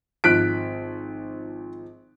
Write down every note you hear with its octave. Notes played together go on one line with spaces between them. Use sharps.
G#1 F3 F#6 B6 D7